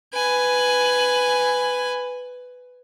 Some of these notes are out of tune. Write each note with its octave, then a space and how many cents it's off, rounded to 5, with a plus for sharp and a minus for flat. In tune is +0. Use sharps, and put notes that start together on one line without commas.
B4 +10 G#5 +0